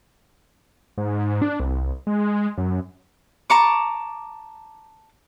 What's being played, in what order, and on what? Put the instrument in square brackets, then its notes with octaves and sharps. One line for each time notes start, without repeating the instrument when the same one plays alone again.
[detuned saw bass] G#2
D4
C2
G#3
F#2
[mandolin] A5 A#5 C#6 D6